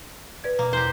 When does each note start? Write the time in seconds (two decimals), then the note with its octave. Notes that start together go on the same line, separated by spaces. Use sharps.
0.44 B4 D5 G#6
0.59 B2 A#3
0.73 E2 G4 C5